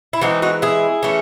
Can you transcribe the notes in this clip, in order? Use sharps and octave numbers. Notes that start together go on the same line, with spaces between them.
E4
E3 G#3 C4 D#4 F#4
D#4 F#4
E4 G#4
E3 A3 C#4